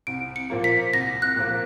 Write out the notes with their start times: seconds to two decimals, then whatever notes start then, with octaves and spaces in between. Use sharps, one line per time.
0.07 C2 D7
0.36 C#7
0.50 A#2 F3 A#3
0.64 B6
0.93 C2 A#6
1.22 F#6
1.36 A#2 F3 A#3